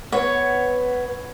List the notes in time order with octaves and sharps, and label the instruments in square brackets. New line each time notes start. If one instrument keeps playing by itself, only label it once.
[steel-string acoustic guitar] B3 [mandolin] C#5